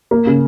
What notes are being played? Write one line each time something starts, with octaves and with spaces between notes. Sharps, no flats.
A#3
C#3